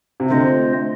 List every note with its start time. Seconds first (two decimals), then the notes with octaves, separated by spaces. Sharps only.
0.20 C3
0.30 D3 A3 C4 F4 C5 D#5